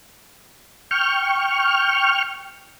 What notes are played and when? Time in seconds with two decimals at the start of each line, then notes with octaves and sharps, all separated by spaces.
0.91 G5 C#6 F6